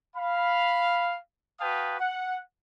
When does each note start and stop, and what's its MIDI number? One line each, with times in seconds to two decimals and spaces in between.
0.16 1.16 77
0.16 1.16 83
1.60 1.98 66
1.60 1.98 71
1.60 1.98 77
1.60 1.98 79
1.60 1.98 81
1.60 1.98 87
1.99 2.39 78